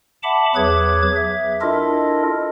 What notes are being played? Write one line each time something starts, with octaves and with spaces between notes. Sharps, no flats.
E5 F#5 A5 B5 D6
E2 F#3 G#4 B4 D6 G#6
E5
D4 E4 F4 A4 A#4 D#5